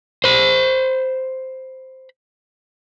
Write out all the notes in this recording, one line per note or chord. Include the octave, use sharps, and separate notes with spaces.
C5 B5